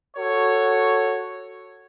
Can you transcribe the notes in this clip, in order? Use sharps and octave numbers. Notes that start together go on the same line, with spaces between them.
F#4 A4 C#5